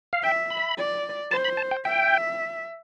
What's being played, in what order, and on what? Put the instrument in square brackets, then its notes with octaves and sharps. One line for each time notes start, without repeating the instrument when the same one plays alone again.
[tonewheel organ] F5
[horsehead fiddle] E5 [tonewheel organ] G5
[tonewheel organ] B5
[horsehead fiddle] D5
[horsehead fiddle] C5 [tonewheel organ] A5
[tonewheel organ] B5
A5
G5
[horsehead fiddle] E5 [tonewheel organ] G5